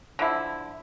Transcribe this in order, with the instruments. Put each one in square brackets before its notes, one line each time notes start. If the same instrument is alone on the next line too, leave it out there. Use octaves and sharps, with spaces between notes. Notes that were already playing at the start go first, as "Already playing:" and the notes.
[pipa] D3 F3 E4